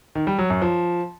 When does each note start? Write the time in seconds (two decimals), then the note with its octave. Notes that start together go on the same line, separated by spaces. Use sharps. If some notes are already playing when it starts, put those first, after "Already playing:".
0.15 D#3
0.27 G3
0.39 F#3
0.50 F#2
0.62 F3